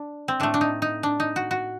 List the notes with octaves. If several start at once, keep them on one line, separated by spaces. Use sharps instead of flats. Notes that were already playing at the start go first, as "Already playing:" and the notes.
Already playing: D4
C4
A2 A3 D4
D4
D#4
D#4
D4
D#4
F#4
F#4